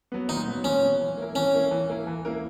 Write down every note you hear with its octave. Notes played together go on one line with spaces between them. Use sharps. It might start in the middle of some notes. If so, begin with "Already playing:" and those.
F#3 B3
A#2 D#4
F#3 B3
A#2 C#4
F#3 B3
E3
A#3 E4 A#4
E3 C#4
A#3 E4 A#4
E3
A#3 E4 A#4
E3
A#3 E4 A#4